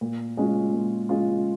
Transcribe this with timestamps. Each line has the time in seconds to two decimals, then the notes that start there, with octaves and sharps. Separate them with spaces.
0.01 A#2
0.37 G#3 C#4 F4
0.73 A#2
1.09 G#3 C#4 F4